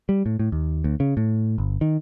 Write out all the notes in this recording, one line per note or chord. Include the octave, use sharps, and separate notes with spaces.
G3
A2
A2
D#2
D2
C#3
A2
G1
D#3